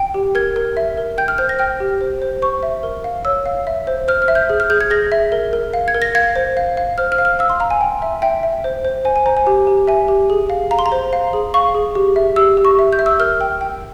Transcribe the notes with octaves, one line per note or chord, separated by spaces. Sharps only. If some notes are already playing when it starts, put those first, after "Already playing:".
Already playing: G5
G4
A#4 G#6
A#4
E5
A#4
G5 G6
F6
C5 G6
A#6
G5 F6
G4
C5
C5
C5 C#6
E5
A#4
F5
C#5 E6
F5
E5
C5
C5 F6
F6
E5
G6
G#4
F6
G#4 G6
G#6
G#4 A#6
E5
A#4
A#4
F5
G#6
A#4
A#6
F5 G#6
C5
F5
F5
C5 F6
F6
F5
F6
F5 E6
C6
F5 A#5
G#5
G5
E5
E5 G5
E5
C5
C5
C5 G#5
G#5
C5 A#5
G#5
G4
G4
E5 G#5
G4
G#4
F5
F5 A#5
C6
A#5
C5
F5
G#4
F5 C#6
G#4
G4
E5
G4 E6
G4
C#6
E5
G6
E5
E6
A#4 F6
G5
G5